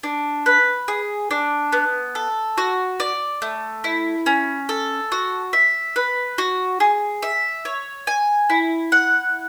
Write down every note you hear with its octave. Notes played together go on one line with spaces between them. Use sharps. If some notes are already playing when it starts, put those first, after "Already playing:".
D4
B4
G#4
D4
B3
A4
F#4
D5
A3
E4
C#4
A4
F#4
E5
B4
F#4
G#4
E5
C#5
G#5
E4
F#5